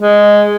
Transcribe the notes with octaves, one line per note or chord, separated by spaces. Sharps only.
G#3